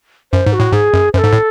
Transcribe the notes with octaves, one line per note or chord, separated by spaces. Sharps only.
F#2 C5
G#2
F#4
A2
G#2 G#4
F#2
F#2 C5
A4
G#2
A2